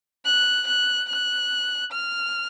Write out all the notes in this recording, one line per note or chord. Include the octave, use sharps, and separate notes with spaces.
F#6
F#6
F#6
F6